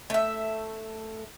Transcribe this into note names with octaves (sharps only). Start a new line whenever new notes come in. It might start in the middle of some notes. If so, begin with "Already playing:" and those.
A3 E5